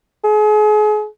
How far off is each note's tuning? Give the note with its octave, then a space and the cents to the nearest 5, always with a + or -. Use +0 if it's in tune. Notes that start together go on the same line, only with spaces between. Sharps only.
G#4 +35